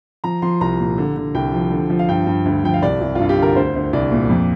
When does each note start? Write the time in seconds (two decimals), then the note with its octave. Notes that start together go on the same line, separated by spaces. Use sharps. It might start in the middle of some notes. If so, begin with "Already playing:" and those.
0.24 F3 A#5
0.42 F3 C6
0.61 C2 A#5
0.79 A#2
0.98 D3
1.16 D3
1.35 C2 G5
1.53 F3
1.71 D3
1.90 F3
1.99 F5
2.09 G2 G5
2.27 G2
2.45 D2
2.64 F3 G5
2.74 F5
2.82 C2 D5
3.01 C2
3.15 G2 F4
3.29 G4
3.37 D3
3.43 A#4
3.56 D2 C5
3.75 D2
3.93 C2 D5
4.12 A#2
4.30 F2